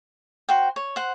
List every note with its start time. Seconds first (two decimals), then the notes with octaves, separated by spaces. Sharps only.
0.49 F#4 C5 G5
0.76 C#5
0.96 C5 F#5